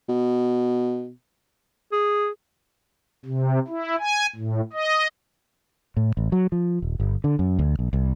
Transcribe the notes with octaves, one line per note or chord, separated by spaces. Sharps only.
B2
G#4
C3
E4
G#5
A2
D#5
A2
A1
F#3
F3
D#1
G1
D3
F#2
D2
B1
C2